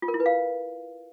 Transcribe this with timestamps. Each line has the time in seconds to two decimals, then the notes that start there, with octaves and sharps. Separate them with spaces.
0.02 F4
0.08 A#4
0.14 E4
0.20 B4
0.26 F5